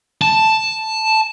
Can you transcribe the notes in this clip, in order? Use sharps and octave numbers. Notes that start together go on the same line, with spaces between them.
A5